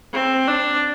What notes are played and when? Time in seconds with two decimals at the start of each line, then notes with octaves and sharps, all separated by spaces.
0.13 C4
0.47 D4